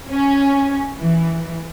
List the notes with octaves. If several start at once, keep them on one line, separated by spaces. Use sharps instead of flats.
C#4
E3